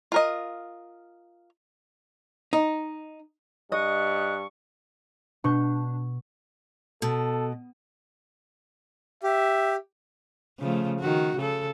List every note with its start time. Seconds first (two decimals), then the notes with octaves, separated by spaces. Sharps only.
0.12 F4 A#4 D#5
2.53 D#4
3.72 G2 D#5 C#6 D#6 F#6
5.44 B2 D4 C#6 G6
7.02 B2 A4
9.23 G4 E5
10.59 C#3 F3 A3
11.00 D#3 F#4
11.37 C#3 A4